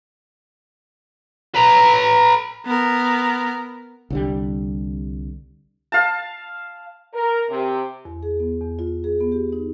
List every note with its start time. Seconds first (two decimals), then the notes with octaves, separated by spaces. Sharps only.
1.55 B4 A#5
2.66 B3 A#4
4.10 C2 D3 G3
5.92 F5 A5
7.14 A#4
7.49 C3
8.05 E2
8.23 G#4
8.40 B3
8.61 E2
8.79 F4
9.04 G#4
9.20 B3
9.32 G4
9.53 D#4